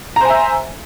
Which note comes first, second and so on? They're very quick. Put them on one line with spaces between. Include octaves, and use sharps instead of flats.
A#5 C5 G#5 E5